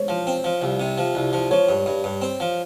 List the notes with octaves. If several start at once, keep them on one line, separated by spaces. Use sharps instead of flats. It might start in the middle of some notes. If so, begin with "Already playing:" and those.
Already playing: C5 C#5
F3
C4
F3
C2
C3
F3
C2
F3
F3 C#5
G2
G2
G2
C4
F3